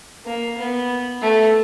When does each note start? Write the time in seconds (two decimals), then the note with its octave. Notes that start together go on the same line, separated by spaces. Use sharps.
0.25 A#3
0.57 B3
1.22 A3